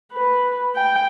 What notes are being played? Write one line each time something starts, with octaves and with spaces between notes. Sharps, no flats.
B4
G5